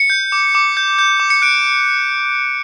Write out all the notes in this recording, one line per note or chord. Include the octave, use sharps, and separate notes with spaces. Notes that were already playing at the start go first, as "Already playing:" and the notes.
Already playing: C#7
G6
D6
D6
G6
G6
D6
C#7
F#6 D7